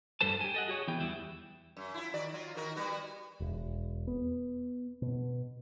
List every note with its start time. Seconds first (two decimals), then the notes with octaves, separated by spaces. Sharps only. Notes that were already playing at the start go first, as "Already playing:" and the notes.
0.21 G2 G3 A4 C5 A5
0.41 G4 G#5
0.54 A4 D#5 F#5
0.68 F#4 G#4 C#5
0.87 E3 B3 G5
1.00 E2 G3 E4
1.77 F#2
1.94 E4 F4
2.14 D#3 F#4 D5
2.33 F#3 F4
2.55 D#3 F#4 A#4
2.76 G3 B3 F#4
3.40 E1
4.07 B3
5.02 B2